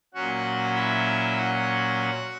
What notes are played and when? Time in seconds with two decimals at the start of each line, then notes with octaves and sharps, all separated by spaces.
0.14 A#2 F#3 C#4 F#4 F#5
0.75 E4 E5
1.36 F#4 F#5